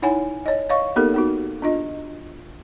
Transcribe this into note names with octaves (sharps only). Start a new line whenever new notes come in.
D#4 E4 C#5 F#5 G#5
C#5 D#5
C#5 D#5 F5 C#6
A#3 B3 D#4 G4 A4 A#4
B3 D#4 F#4
D4 F4 D#5